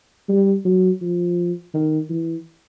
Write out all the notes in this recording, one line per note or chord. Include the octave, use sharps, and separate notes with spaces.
G3
F#3
F3
D#3
E3